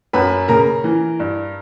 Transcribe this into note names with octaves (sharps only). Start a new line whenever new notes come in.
F#2 B4 B5
C#3 A#4 A#5
E3
G2